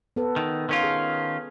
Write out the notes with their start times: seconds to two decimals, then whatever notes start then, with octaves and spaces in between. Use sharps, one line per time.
0.16 B3 A4 B4
0.36 D#3
0.69 D#3 C#4 F4
0.84 G#4